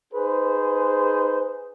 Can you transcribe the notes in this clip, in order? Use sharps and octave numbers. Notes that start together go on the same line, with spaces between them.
D#4 G#4 B4 C5